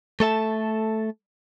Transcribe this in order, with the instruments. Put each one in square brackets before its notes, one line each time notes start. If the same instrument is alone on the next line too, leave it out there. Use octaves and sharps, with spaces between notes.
[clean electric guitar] A3 A4 E5 A5